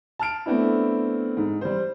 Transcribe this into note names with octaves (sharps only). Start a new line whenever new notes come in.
A5 F6 D7
A3 B3 C4 D4 E4
G#2
G3 C5